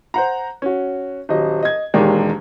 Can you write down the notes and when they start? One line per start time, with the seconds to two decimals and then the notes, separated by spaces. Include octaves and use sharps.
0.14 C5 F#5 A#5
0.62 C#4 F#4
1.29 D#1 F#3 D#5
1.63 D#5 G#6
1.94 E1 D#2 D#3 G#3 G4 D5